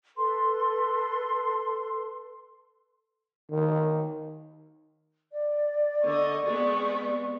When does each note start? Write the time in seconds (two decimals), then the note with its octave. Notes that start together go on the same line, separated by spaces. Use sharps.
0.17 A4 B4 C6
3.50 D#3
5.32 D5
6.05 D3 D#5 C#6
6.47 G#3 B3 C4